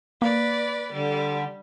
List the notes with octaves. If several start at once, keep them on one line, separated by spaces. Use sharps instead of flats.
A#3 B4 D5
D3 G3